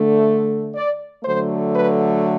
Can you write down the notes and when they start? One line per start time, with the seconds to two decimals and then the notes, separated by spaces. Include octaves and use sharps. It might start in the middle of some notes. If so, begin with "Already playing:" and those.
Already playing: D3 A3
0.75 D5
1.24 D3 F#3 A3 C5
1.74 B4